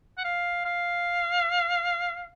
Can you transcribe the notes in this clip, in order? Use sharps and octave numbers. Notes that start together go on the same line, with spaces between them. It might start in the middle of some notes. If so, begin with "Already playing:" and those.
F#5
F5
F5